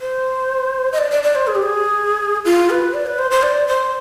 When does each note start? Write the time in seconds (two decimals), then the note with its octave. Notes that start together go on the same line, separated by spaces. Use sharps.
0.01 C5
0.93 D#5
0.98 D5
1.11 D5
1.23 D5
1.35 C5
1.47 G#4
1.55 G4
1.63 G#4
2.45 F4
2.70 B4
2.94 D5
3.06 B4
3.19 C5
3.31 C5
3.43 D5
3.68 C5